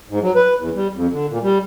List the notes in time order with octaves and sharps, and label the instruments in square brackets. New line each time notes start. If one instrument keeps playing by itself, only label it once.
[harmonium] G#2
F#3
B4
E2
G3
F2
D3
A#2
G3